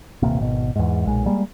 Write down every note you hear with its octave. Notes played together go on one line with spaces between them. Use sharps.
D#1 A1 C3 A#3
G#1 B2
E2 G#2
B1 A#2 G#3
G3 G#3 A#3